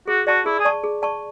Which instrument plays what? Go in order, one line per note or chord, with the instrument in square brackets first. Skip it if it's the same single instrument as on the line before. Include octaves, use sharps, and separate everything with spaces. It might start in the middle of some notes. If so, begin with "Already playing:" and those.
[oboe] F#4 [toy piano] G#4
[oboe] F#4 [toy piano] D5 A5 C#6
[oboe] E4 [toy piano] G#4
[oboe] G#4
[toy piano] D5 A5 C#6
G#4
D5 A5 C#6